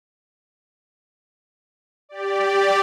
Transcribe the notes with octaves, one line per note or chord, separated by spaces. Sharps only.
G4 D5